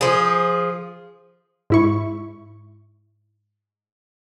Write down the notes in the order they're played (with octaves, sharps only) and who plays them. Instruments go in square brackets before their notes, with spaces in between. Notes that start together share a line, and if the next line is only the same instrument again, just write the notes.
[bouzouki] F3 G#4
[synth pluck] G#2 E4 C#6